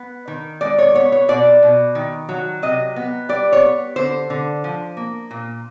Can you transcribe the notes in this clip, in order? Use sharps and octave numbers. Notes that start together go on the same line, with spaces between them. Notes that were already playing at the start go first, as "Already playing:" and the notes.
Already playing: B3
D#3
G#3 D5
C#5
B3 C#5
C#5
B2 D5
B2
D#3
F#3
C3 D#5
B3
G3 D5
C#5
B3
D3 C5
D3
F3
A#3
A#2